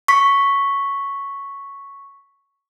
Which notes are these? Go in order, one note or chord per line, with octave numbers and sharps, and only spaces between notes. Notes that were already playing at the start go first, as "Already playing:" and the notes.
C#6 B6